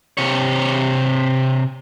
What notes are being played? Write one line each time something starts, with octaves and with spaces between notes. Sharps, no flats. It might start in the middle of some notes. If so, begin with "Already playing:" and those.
C3 C#5